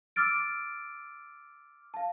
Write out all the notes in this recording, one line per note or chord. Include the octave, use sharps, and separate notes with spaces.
D6 E6 F6 A6 D7
F5 A5